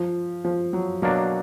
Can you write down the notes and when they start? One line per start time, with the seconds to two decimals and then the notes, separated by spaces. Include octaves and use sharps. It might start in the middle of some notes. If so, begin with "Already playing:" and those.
Already playing: F3
0.45 F3
0.73 F#3
1.02 B2 F#3 A#3 D4 F#4